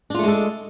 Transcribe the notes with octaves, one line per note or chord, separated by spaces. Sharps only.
G#3 A3 D4 F4 A4